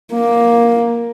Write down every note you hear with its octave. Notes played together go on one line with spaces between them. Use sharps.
A#3